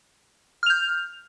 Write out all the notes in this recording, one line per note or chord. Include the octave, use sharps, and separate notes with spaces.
F6 G6 F7